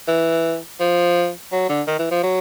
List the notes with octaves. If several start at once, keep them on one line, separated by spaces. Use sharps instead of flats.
E3
F3
F#3
D3
D#3
E3
F3
F#3